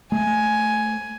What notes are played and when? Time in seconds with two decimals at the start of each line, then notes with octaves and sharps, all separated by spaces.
0.12 A3 G#5